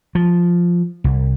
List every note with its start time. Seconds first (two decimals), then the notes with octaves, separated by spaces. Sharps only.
0.15 F3
1.04 C2